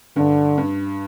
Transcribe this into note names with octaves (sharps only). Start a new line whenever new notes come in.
G2 D3
G2